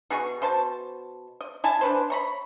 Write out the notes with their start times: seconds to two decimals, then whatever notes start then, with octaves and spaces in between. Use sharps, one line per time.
0.10 B2 F#4 G#4 C#6
0.42 B2 C5 A5
1.41 D#5
1.64 E4 G#5 A5
1.81 D4 B4 C5
2.10 C#5 A#5 B5